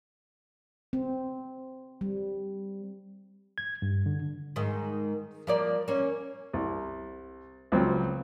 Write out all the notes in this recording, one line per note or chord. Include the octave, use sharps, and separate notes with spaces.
C4
G3
G#6
G2
D3
G#2 D#3
F3 A#3 D5
A#3 C#4
C2
C#2 F3 F#3 C4